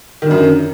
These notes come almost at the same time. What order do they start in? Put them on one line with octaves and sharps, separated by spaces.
D#3 D3 F#2